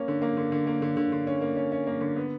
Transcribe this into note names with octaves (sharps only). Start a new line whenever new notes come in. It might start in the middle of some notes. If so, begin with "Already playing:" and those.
Already playing: A#3 C#4
D3
A#3
D3
D3
A#3
D3
D3
D3
C#4
A#3
C#4
C#4
A#3
D3
B3